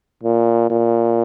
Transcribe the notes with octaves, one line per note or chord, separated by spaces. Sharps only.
A#2
A#2